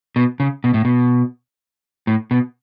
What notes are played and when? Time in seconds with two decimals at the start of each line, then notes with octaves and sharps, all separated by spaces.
0.16 B2
0.40 C#3
0.64 B2
0.74 A2
0.85 B2
2.07 A2
2.31 B2